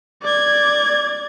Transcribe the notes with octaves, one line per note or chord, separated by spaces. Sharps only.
D5 G#6